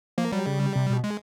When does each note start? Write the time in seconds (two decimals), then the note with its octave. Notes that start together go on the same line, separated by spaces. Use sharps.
0.18 F3 A#3
0.32 F#3 G3
0.46 C#3
0.75 C3
0.90 B2
1.04 G#3